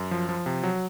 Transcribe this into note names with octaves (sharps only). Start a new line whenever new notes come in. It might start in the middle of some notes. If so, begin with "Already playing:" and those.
Already playing: F#2
F3
F3
C3
F#3